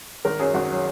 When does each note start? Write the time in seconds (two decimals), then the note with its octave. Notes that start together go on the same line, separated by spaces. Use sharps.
0.25 G#1 A#4
0.40 F#2 F#3 G#4
0.54 G#1 F#4
0.72 F#3